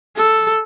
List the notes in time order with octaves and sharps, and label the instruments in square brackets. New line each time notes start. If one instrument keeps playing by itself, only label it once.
[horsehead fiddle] A4